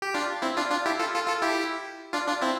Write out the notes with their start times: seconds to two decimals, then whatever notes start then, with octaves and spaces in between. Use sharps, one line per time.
0.02 G4
0.14 D4 F4
0.42 C4 E4
0.57 D4 F4
0.71 D4 F4
0.86 E4 G4
0.99 F4 A4
1.14 F4 A4
1.27 F4 A4
1.42 E4 G4
2.13 D4 F4
2.28 D4 F4
2.41 C4 E4